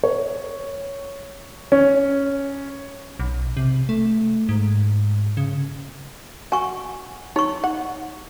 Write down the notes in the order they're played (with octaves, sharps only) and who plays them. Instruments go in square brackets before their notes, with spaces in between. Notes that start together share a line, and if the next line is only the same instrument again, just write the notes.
[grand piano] C#5
C#4
[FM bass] B1
C3
A3
G#2
C#3
[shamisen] F#4 [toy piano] G#5 C#6
[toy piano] D#4 C#6 [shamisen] C#5
[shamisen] F#5